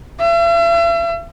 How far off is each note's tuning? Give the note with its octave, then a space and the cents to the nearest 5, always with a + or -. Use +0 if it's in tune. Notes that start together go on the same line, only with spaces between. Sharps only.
E5 +45